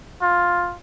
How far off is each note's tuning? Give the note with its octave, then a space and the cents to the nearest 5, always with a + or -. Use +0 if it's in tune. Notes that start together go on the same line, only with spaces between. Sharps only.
F4 +10